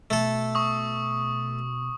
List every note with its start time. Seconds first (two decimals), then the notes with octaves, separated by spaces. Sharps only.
0.10 B2 A3 A4
0.55 C#6 D#6